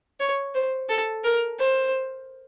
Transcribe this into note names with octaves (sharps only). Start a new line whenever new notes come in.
C#5
C5
A4
A#4
C5